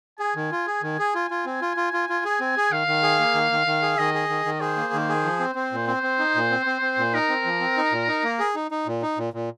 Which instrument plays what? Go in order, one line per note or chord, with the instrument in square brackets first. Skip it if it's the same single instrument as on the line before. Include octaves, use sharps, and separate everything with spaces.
[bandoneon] G#4 [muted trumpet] G#5
[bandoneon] D#3
F4
G#4
D#3
G#4
F4
F4
C4
F4
F4
F4
F4
G#4
C4
G#4
[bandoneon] D#3 [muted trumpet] F5
[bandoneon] D#3
G#4
A#3
D#3
D#3
D#3
G#4
[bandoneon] D#3 [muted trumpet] D#5
[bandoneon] G#4
D#3
D#3
[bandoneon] G#4 [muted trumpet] C5
[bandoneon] A#3
D#3
G#4
F3
C4
C4
A#2
[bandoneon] C4 [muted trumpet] C5
[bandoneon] C4
D#4
A#2
C4
C4
C4
A#2
[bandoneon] D#4 [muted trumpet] A#4
[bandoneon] C4
F3
C4
D#4
A#2
D#4
A#3
G#4
D#4
D#4
A#2
D#4
A#2
A#2